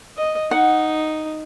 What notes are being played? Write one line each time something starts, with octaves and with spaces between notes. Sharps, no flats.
D#5
D#4 F#5